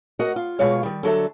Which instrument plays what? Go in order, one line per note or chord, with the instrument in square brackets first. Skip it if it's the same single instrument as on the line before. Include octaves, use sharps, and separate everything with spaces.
[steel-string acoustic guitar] F#4 A#4 D#5 F#5
F4
B2 G#3 F4 C#5 F5
D#3 G3
D3 F#3 A4 E5